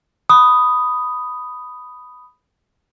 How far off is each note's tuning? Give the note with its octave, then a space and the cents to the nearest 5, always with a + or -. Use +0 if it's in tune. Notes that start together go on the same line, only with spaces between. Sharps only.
B5 +5 D#6 +0